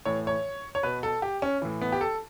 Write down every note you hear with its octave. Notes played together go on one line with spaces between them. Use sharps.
A2 E3 C#5
C#5
C#5
B2 B4
A4
G4
C#4
A2 E3
B3
G4
A4